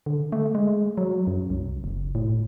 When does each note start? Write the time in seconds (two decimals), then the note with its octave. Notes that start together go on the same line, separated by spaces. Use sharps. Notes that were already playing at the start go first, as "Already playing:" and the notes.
0.06 D3
0.32 A3
0.55 G#3
0.98 F#3
1.27 F#2
1.50 C2
1.84 F#1
2.15 A2